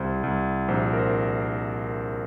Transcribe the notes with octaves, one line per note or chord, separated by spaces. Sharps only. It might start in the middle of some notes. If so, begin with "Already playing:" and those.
Already playing: C2 C5
C2
A#1 C5
A#4
C5